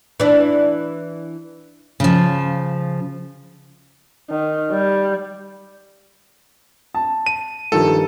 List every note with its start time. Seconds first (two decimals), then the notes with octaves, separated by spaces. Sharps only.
0.20 E3 D4
2.00 C#3 F3
4.30 D#3
4.71 G3
6.95 A5
7.26 D#7
7.72 G2 D#3 F3 A4